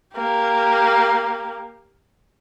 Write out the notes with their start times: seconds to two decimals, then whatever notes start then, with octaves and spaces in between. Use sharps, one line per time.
0.15 A#3 G4